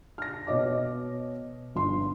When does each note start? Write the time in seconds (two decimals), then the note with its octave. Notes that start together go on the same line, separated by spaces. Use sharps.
0.18 F6 A#6
0.47 B2 C#5 D#5 D6
1.75 G1 C6